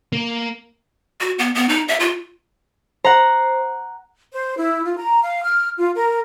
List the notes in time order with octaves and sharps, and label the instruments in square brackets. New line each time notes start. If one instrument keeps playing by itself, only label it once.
[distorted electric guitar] A#3
[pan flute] F#4
B3
B3
D#4
E5
F4
[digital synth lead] C5 [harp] F#5 A#5
[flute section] C5
E4
F4
A#5
F5
F6
F4
A#4